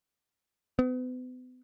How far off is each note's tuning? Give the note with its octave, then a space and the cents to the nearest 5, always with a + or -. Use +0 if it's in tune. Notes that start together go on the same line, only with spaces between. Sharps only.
B3 +40